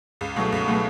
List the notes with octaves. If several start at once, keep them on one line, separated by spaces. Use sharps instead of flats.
C#2
B2 F#3 A3
C#2
B2 F#3 A3